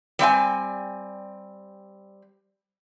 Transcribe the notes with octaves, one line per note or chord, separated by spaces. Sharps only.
G3 C4 E5 G#5